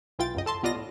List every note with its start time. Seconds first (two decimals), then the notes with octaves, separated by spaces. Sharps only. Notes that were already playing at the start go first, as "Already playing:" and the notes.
0.19 B1 E3 F4 G5 A6
0.35 C#2 F#2 D#5
0.46 A4 A5 C6
0.63 C2 B3 F4 D5 D#5 A#6
0.75 A2